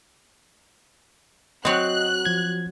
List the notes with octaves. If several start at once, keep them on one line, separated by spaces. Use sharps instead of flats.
F#3 C4 D#5 F#6
F3 G#6